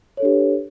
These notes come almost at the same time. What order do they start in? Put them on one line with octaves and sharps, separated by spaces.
C#5 A4 D4 G4 B4